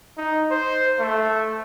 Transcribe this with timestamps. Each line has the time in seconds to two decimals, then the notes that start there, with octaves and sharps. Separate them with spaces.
0.17 D#4
0.51 C5
0.99 A3